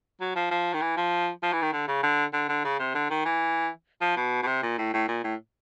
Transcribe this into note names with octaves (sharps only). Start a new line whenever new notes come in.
F#3
F3
F3
D#3
E3
F3
F3
E3
D#3
D3
C#3
D3
D3
D3
C#3
C3
D3
D#3
E3
F3
B2
B2
C3
A#2
A2
A2
A#2
A2